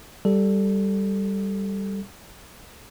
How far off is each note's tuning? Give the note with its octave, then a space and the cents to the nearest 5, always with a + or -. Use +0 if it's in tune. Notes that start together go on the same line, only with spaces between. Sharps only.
G3 +0 A4 +0